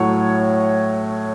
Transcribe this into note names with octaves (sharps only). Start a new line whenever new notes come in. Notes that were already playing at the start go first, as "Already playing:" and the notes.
Already playing: A2 F#3 A3 C#5